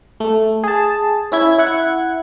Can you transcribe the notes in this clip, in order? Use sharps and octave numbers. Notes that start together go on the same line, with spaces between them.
A3
G#4 A5
C#4 E4 G#6
E4 F#5 G#6